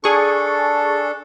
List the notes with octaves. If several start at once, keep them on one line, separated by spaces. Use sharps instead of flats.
D4 G#4 A4 C#6